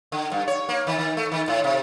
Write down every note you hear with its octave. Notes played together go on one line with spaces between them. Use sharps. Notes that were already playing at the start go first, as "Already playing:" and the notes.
D3
G2
C#5
A#3
D#3
D#3
A3
D#3
A2
C3